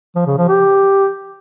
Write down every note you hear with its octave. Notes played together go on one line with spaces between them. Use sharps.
F3
C#3
F3
G4